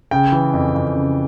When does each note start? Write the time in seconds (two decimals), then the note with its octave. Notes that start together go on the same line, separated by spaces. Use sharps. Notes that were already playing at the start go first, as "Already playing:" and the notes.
0.11 C#3 G5
0.32 E3
0.54 F2
0.75 F2
0.95 C#3